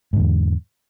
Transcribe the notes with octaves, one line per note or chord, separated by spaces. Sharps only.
E2 G#2 D3